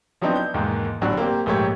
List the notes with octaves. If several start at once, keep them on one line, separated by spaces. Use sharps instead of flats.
F3 F#3 B3 C4 D4 D#4
G6
E2 G#2 B2 D#3 A#3
G1 A2 F#3 D4 F#4
A#3 C4 G4
A#1 G#2 A3 A#3 G4 C#5